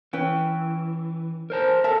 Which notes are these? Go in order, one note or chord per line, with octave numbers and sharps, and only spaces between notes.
E3 C#4 B4 G5
A#4 C5 A5
A4 A#4 E5 A5